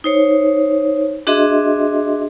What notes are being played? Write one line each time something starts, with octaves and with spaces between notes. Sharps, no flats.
D#4 C5 C#5
D4 F#4 G#4 D#5 E5 C6